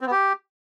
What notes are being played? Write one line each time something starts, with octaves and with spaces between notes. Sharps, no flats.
C4
B3
G4